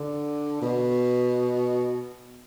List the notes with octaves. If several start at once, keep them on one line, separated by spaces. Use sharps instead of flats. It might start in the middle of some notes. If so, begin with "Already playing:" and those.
Already playing: D3
B2